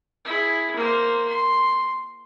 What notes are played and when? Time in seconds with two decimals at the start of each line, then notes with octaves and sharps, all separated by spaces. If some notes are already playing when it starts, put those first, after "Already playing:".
0.25 E4 G#4
0.76 A#3 C5
1.28 C6